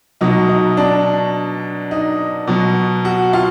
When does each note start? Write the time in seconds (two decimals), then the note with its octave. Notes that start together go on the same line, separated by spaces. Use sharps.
0.21 B2 F#3 D#4
0.49 D#4
0.77 D4
1.91 D#4
2.47 B2 F#3
3.05 F#4
3.33 F4